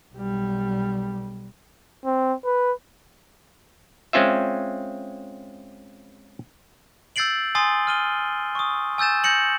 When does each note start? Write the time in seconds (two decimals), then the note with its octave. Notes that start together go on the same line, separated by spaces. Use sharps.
0.15 B1 G3
2.05 C4
2.45 B4
4.13 G#3 C4 C#4 F4 E5
7.16 E6 G6 A6 C7 D7 F#7
7.55 G#5 C6 D#6 A6 C7 G7
7.87 F6 D#7 G7
8.55 C#6 D#6
8.98 G#5 E6 G6 A6 E7
9.24 G6 A#6 C#7 F#7